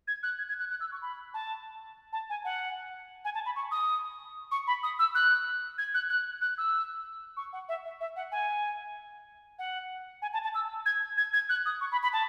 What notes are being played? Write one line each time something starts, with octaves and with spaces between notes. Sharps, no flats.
G#6
F#6
G#6
G#6
F#6
F#6
E6
C#6
B5
A5
A5
G#5
F#5
G#5
A5
B5
C#6
D#6
C#6
B5
D#6
E6
F#6
G#6
F#6
F#6
F#6
E6
C#6
F#5
E5
E5
E5
F#5
G#5
F#5
G#5
A5
A5
E6
G#6
G#6
G#6
F#6
D#6
C#6
B5
B5
A5